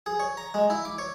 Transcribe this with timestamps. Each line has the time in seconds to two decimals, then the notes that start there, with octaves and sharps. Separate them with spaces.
0.06 G#4
0.20 C#5
0.37 A#5
0.54 G#3
0.70 E4
0.85 D6
0.98 C#5